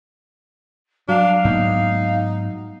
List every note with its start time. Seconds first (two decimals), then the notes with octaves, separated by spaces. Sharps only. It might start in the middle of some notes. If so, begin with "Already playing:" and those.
1.08 F#3 D4 F5
1.45 G#2 A#3 B3 D#4